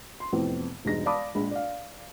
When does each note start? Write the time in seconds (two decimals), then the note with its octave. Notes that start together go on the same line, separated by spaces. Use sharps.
0.20 C6
0.33 F2 A2 C3 E3 B3 C4
0.85 E1 G2 G#3 D#4 A#6
1.06 D5 F5 A5 B5 D6 D#6
1.35 A#1 G#3 B5
1.51 D5 F5